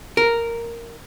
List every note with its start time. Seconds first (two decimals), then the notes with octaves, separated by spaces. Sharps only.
0.17 A#4